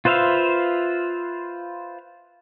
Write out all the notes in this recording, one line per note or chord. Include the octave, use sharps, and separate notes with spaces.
F4 B4 C5 E5 F5